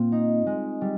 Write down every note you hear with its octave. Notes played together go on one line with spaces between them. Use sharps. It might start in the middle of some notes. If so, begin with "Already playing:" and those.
Already playing: A#2 C4 F4
D#4
G#3
G3